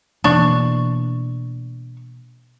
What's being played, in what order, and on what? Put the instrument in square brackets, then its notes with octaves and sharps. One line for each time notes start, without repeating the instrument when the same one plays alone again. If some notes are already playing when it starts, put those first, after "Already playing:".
[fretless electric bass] B2 E3 A#3 [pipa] D4 C#6